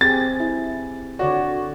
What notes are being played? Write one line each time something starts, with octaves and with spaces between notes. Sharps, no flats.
C4 G4 G#4 A6
E4
D3 F#4 C#5 D5